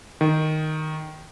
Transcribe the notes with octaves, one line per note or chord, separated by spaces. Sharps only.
D#3